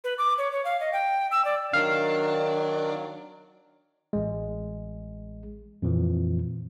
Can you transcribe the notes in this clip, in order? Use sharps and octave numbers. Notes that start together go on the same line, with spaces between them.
B4
D6
C#5
C#5
F5
D#5
G5
E6
D5
D#3 F#3 D4 F5
A1 G#3
F2 A#2 E3 F3